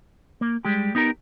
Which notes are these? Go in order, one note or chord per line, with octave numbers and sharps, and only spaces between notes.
A#3
G3 G#3 G4
B3 D#4 G4 A#4